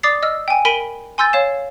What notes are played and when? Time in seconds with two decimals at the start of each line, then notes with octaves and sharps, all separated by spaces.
0.03 D5 D6 D#6 A6 C7
0.23 D#5 E6 F6
0.48 G5 G#5
0.65 A#4 B5 B6 D7 D#7 G7
1.18 G#5 C6 E6 G6 A6
1.33 C#5 F5 E7